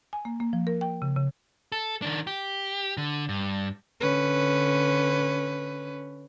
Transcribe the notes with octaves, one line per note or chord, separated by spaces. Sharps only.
G#5
A#3
A#3
F3
A#4
G5
C#3
C#3
A4
D#3 D4
G4
D3
G2
D3 C#4 B4